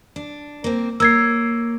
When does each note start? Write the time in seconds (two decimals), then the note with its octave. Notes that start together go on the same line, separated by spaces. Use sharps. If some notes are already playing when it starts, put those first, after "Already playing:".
0.16 D4
0.64 A#3 C4
1.00 A#3 C#5 E6 G#6 C7